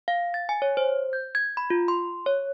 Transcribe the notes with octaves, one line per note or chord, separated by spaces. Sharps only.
F5
A6
G#5
C#5
C5
G6
G#6
B5
F4
C6
C#5